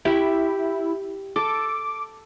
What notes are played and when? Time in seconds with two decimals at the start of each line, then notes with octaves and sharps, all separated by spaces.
0.05 E4 G4 E5
1.36 A4 D6